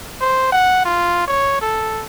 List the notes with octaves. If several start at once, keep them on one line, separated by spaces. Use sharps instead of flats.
C5
F#5
F4
C#5
A4